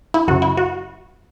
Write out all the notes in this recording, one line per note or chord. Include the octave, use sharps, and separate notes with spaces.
E4
F#2 C#3 F#3 F#4
E4
F#4